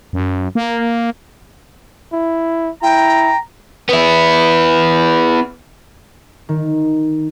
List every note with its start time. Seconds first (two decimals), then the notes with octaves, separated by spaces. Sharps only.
0.13 F#2
0.55 A#3
2.13 E4
2.83 E4 G5 A#5
3.89 B3 E4
6.49 D#3